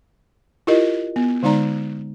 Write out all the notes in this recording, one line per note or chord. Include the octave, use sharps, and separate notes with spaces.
E4 F4 G4 A#4 D#5
B3
D3 G#3 D#4 D5 A#5